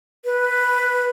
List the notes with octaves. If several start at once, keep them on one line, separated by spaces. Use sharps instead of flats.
B4